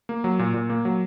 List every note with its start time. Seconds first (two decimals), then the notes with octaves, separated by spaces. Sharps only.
0.09 A#3
0.24 F#3
0.39 A#2
0.54 A#2
0.70 A#3
0.85 F#3